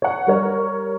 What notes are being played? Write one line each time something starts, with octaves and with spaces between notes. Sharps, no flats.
C#5 F#5
G3 A#4 C#5